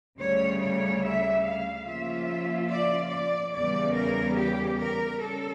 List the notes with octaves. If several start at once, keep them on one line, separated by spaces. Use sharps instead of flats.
D2 C#3 G3 C#5
C#5
E5
F5
C#3 F3 A#3 C#4 F4 E5
D5
D5
E2 C#3 G3 D5
A#4
G4
A#4
G3 C#4 A4